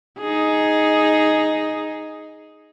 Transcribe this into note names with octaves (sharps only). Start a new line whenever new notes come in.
D#4 G#4